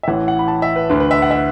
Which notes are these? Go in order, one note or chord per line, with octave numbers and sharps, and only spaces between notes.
E5
A1 A2 E3 F#5
F#5
B5
A5
E5
B4
D2 D3 B4
B4
E5
F#5
E5